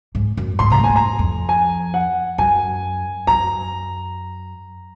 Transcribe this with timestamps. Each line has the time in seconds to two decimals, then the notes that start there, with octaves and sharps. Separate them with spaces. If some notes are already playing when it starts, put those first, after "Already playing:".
0.15 G#2
0.37 F#2
0.59 G#2 C6
0.70 C3 A#5
0.79 A#2 G#5
0.89 G#2
0.96 A#5
1.19 F2
1.49 G#5
1.94 F#5
2.38 F#2 G#5
3.27 F#2 A#5